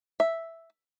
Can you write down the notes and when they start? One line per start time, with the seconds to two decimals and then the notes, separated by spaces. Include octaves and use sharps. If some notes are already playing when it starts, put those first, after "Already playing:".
0.20 E5